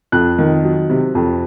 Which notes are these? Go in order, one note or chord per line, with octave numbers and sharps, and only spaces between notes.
F2 F#6
D#3
F#3
C3
F2